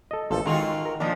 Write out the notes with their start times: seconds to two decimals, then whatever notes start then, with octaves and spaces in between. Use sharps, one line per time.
0.11 A4 D#5
0.31 A1 A#2 F3 A4
0.46 D#3 G#3 F4 F#4
0.86 A#4
1.00 A#2 F3 D4 D#5